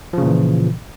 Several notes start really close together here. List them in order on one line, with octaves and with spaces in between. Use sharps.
F3 C#3 A#2 E3